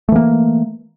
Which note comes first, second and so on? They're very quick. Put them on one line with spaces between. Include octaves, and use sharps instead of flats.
A3 E3 A#3